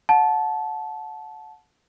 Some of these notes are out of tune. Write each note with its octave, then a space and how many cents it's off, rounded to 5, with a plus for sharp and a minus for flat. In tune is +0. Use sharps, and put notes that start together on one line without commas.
F#5 -25 A5 -15